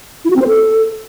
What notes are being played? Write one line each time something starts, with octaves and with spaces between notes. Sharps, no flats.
E4
F#4
C4
C5
A4